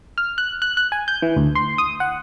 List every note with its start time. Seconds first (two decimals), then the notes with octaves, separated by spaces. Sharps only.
0.18 F6
0.38 F#6
0.62 F#6
0.77 F#6
0.92 G#5
1.08 G6
1.22 E3
1.36 D2
1.55 C6
1.78 D#6
2.00 F#5